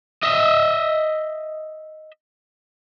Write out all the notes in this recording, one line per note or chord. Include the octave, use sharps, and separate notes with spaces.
D#5 E5